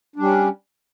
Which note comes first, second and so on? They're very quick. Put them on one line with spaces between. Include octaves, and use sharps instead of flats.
D4 G3 C#4